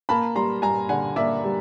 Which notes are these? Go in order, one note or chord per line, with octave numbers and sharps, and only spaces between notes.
A#3 A5 B5
G3 A#5 C6
G2 G#5 A#5
D3 F#5 G#5
A#3 D5 E5
G3